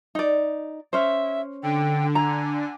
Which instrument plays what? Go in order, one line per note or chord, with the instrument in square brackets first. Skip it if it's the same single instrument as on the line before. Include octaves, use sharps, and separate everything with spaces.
[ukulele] D#4 D5
[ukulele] C#4 C5 [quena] E5
[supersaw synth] D3 [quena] G5
[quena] G#5 [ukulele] A#5